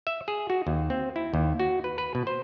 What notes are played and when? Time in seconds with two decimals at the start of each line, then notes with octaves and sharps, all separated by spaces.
0.07 E5
0.28 G#4
0.50 F#4
0.67 D#2
0.90 C4
1.16 E4
1.34 D#2
1.60 F#4
1.84 B4
1.98 B4
2.15 B2
2.27 C5